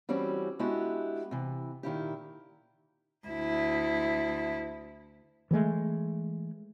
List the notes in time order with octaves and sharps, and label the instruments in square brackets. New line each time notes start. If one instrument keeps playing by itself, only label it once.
[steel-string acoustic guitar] E3 G3 C4 C#4 F#4
G#3 B3 D4 E4 F#4 G4
C3 E3
A#2 D#3 E4 G4
[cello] D2 E4
[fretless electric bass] E3 F#3 G#3 A3